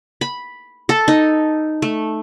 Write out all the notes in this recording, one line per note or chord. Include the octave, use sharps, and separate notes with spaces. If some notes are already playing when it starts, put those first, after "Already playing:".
B5
A4
D#4
A3